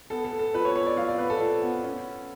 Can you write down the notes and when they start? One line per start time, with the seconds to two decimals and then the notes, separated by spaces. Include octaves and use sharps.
0.10 B3 A4
0.25 A4
0.32 B3
0.39 A4
0.54 F3 B4
0.65 C#5
0.76 F3 C#5
0.87 D5
0.97 F3 F5
1.08 D5
1.18 B3 B4
1.30 A4
1.40 F3 A4
1.62 B3
1.84 C#4